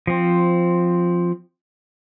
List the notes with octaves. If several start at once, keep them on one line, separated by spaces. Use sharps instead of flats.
F3 C4